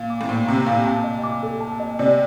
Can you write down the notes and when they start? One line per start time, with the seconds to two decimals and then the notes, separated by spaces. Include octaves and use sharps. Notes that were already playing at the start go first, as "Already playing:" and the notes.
Already playing: A#2 F5
0.10 D6
0.21 A2
0.29 A#2 C5
0.47 C3 A#5
0.66 A#2 F5
0.86 A5
1.04 D#5
1.24 D6
1.43 A4
1.61 A5
1.80 D#5
1.99 C3 D5